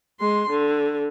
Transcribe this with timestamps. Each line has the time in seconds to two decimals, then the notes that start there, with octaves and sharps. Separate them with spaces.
0.20 G#3 C6
0.50 D3